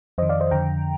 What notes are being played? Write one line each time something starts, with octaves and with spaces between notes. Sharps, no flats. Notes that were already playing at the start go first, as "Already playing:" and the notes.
F2 D#3 C5 D#5
D5 F5
C5 D#5
F2 D3 G5 A#5